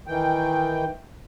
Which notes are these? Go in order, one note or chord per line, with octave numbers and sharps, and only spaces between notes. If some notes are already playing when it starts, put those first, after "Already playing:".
D#3 E3 G5